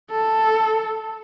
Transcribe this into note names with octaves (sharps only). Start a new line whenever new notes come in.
A4